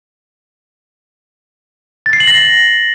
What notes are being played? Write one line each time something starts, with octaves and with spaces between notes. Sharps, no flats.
A6
C7
F#7
A#6
C7